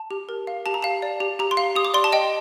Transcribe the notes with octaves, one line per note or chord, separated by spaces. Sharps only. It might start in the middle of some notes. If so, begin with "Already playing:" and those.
Already playing: A5
G4
A#4
F5
G4 A5
A#5
F5 A5
D5
G4
G4 A#5
C6
F5
G4 D#6
D6
D5 C6
A5
D#5 G5